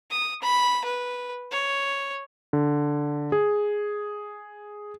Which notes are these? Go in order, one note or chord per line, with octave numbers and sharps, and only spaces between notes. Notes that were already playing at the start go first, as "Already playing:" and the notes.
D#6
B5
B4
C#5
D3
G#4